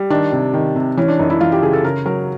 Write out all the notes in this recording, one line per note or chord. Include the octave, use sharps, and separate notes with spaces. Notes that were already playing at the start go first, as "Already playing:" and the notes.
Already playing: G3
D#3 D4
C3
D#3
C3
E3 C#4
D4
F#2 D#4
E4
E3 F4
G4
C#3 G#4
A4
C#3 A#4
F#3 A#4